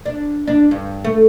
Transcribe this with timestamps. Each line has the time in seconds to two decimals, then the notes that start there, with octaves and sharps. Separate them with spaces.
0.06 D4
0.47 D4
0.71 G2
1.04 A3